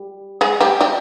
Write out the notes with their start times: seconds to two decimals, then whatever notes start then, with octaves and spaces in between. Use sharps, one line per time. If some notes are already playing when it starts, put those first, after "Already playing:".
Already playing: G3
0.41 G#3 G#4
0.61 G3 G4
0.81 G3 G4